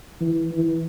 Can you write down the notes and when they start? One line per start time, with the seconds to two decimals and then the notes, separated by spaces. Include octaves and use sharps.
0.21 E3
0.52 E3